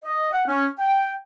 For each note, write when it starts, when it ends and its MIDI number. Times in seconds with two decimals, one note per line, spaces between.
0.04 0.30 75
0.33 0.47 78
0.48 0.66 61
0.79 1.12 79